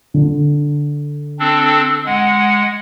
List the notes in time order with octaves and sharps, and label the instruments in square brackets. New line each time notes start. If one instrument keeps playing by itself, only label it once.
[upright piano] D3
[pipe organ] C4 D4 A4
G#3 F#5